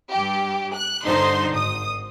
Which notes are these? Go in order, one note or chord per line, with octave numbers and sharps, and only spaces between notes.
G2 G4
F#6
G2 D3 D#4 C5 C6
G#1 D#6